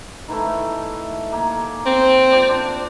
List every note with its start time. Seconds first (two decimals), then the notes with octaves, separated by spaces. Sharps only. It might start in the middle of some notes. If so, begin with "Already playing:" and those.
0.28 D#3 E3 A3
1.32 A#3 G#5
1.86 C4
2.32 F4 C5 D5
2.49 D4 F4